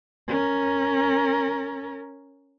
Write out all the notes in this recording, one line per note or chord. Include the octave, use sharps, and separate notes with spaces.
C#4 A#4